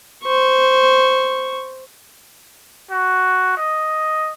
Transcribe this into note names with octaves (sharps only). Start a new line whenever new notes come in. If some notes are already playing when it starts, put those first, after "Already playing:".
C5 C#6
F#4
D#5